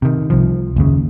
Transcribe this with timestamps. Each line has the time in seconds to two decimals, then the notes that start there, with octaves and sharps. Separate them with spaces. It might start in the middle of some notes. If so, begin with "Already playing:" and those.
0.02 C3 D#3
0.30 C2 F3
0.76 F#1 D#2 C#3